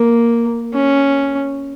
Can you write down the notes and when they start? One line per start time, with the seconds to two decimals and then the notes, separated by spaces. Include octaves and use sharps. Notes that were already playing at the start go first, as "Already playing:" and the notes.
Already playing: A#3
0.73 C#4